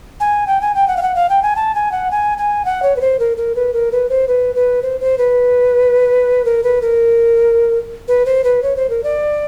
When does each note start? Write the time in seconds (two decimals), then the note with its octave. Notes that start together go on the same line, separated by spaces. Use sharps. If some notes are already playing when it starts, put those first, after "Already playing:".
0.20 G#5
0.47 G5
0.61 G#5
0.75 G5
0.88 F#5
0.97 F5
1.02 F#5
1.15 F5
1.30 G5
1.42 G#5
1.56 A5
1.75 G#5
1.92 F#5
2.11 G#5
2.38 G#5
2.65 F#5
2.83 C#5
2.96 B4
3.01 C5
3.19 A#4
3.37 A#4
3.55 B4
3.73 A#4
3.92 B4
4.09 C5
4.28 B4
4.55 B4
4.82 C5
5.00 C5
5.18 B4
6.45 A#4
6.63 B4
6.82 A#4
8.08 B4
8.26 C5
8.44 B4
8.63 C#5
8.76 C5
8.90 A#4
9.04 D5